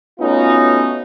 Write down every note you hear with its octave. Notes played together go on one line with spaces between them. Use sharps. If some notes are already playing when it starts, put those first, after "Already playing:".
A3 B3 C#4 D#4 F4 F#4